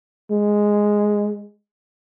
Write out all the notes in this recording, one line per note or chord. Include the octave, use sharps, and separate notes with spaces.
G#3